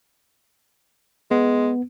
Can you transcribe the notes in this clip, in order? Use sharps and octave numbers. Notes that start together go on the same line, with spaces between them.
G#3 B3